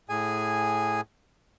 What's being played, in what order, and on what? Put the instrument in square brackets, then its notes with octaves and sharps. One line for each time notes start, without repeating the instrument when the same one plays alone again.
[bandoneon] A2 G#4 G#5